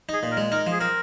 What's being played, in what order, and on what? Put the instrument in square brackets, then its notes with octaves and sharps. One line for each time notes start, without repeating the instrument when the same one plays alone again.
[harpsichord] D#4 [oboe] G#4
[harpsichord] A#2
[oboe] A#4
[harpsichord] G#3
[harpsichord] D#4 [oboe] A#4
[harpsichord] F3
[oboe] G#4
[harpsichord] C4 [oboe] A#4